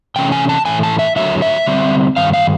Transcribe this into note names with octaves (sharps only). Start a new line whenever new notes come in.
C3 E3 A3 C#4 G5
G#5
A5
A2 E3 A3 G#5
A5
E5
D3 F#3 A3 E5
E5
D3 G3 C4
G2 D#3 F5
F5